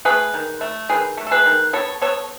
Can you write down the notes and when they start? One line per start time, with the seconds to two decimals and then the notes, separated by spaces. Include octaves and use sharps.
0.05 A3 G#4 B4
0.34 D#3
0.61 A3
0.89 D#3 G#4 B4
1.17 A3
1.27 A4
1.31 G#4 B4
1.46 D#3
1.73 B3 A4 C#5
2.01 B3 A4 C#5